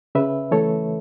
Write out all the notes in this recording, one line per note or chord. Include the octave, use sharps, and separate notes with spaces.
C#3 B4 E5
E3 A3 A4 C#5